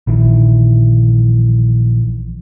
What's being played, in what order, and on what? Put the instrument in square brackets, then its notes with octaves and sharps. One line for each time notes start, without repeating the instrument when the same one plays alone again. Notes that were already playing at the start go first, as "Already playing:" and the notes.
[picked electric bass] A#1 D#3 E3